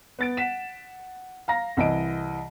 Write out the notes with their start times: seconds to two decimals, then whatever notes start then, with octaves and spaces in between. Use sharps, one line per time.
0.19 B3 A6 D7
0.37 F#5 B6 E7
1.48 F5 A#5 A#6
1.77 C2 E3 D#5 D7